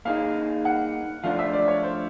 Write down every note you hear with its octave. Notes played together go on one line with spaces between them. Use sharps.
A#3 D#4 G#4 F5
F#5
F3 A3 D4 F4 F5
E5
D5
C#5
C5